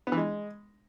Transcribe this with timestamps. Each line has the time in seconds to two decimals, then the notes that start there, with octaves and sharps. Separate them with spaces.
0.07 B3
0.12 E3
0.17 G#3